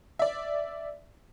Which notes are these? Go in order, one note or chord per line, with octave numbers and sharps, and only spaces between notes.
D5 E5